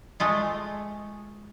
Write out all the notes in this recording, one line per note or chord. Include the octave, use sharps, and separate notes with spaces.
G#3 A3 F4